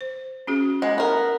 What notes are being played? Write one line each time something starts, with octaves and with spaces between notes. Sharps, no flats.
C5
C#4 F#4 G#4
G#3 B3
B3 A#4